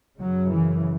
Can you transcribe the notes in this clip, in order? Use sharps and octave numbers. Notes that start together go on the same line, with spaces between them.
F#2 C#3 F#3
E3